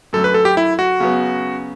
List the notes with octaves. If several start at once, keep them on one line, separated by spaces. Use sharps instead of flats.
F#2 D3 F#3 A3 A4
B4
A4
G4
E4
F#4
C#3 F#3 B3